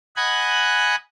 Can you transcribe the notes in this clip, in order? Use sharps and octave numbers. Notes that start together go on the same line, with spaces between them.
D#5 F#5 G#5 B5 F#6 G#6